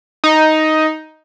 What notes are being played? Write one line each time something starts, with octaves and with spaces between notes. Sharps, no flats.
D#4